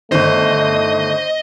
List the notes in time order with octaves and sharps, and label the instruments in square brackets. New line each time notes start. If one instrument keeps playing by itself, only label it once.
[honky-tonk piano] G1 D#3 [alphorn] A3 [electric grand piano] C5 [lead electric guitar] D#5